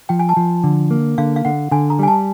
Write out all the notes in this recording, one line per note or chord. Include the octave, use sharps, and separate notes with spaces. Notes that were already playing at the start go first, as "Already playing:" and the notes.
F3 G5
G#5
A5
F3
D3
A#3
D3 F5
F5
D3 F#5
D3 G#5
A#5
G3 G#5
A5